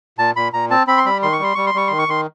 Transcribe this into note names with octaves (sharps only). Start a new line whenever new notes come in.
A#2 A5
A#2 B5
A#2 A#5
C4 A5
C4 B5
C6
G3 B5
D#3 C6
C#6
G3 C6
G3 C#6
C6
G3 C#6
D#3 C6
C#6
D#3 C6